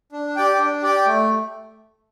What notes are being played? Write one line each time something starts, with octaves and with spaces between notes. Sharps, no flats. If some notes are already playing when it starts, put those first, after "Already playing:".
D4
G4 D5 G5
D4
G4 D5 G5
A3